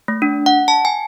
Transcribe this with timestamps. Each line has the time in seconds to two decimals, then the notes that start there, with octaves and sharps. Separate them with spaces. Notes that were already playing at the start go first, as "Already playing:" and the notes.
0.08 A3
0.22 D4
0.46 F#5
0.68 A5
0.85 G#5